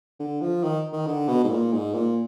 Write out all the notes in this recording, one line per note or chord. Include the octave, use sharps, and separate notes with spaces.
D3
F3
D#3
D#3
D3
B2
G#2
A#2
G#2
A#2